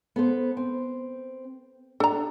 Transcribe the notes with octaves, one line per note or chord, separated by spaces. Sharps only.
B3 A4 C5
C4
D4 A4 A#5